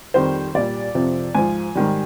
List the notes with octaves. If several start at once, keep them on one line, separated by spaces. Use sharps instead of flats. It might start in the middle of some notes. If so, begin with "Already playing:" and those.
F2 D#3 G3 C5
A#2 G3 D5
F2 C3 F3
G#2 F3 G#5
G#2 D#3 G3